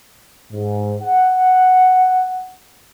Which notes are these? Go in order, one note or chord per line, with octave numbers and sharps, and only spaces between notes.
G#2
F#5